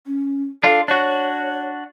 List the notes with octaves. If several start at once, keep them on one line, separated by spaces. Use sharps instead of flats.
C#4
D4 F4 A4
D4 F#4 C#5